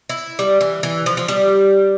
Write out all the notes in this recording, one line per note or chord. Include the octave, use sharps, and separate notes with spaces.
E4
G3
E3
E3
F3
F3
G3